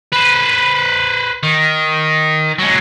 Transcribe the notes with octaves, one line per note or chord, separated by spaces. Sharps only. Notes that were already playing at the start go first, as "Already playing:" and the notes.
B4 C5
D#3
F#3 G#3